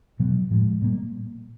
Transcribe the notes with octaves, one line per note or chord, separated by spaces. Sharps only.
B2 F#3 B3
A2 F3 G#3
A#2 G3 A#3